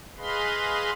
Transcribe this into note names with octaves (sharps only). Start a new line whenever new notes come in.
G#4 B4 D#5 F5 B5 C6